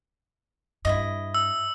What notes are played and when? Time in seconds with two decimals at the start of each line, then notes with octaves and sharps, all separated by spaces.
0.85 G2 E4 F4 D#5
1.34 E6